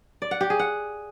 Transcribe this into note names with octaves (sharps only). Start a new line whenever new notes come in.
D5
F#5
G4
G#4
F#5